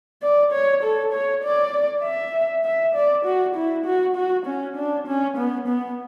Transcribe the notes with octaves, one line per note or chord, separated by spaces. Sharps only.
D5
C#5
A4
C#5
D5
E5
E5
D5
F#4
E4
F#4
F#4
C#4
D4
C#4
B3
B3